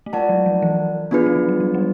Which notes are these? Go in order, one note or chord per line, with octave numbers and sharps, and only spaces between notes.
A3
G#3 F4 A#4 D5 F#5 A5
F#3
F3
E3
F3 B3 D4 F4 G#4 B4
F#3
F3
G3
F#3
G3